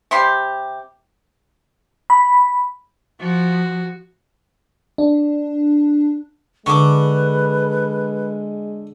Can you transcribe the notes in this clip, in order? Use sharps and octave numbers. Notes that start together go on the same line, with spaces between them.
C3 G3 G4 C6
B5
F3 F#4
D4
D3 G#3 B4 C#6 D6